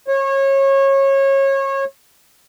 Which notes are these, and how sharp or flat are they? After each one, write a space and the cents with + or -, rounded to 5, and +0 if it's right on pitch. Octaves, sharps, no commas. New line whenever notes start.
C#5 -25